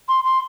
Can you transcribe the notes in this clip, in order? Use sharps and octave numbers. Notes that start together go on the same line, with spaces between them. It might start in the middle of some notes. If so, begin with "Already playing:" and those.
C6
C6